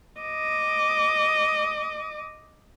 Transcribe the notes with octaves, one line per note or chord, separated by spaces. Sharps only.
D#5 D6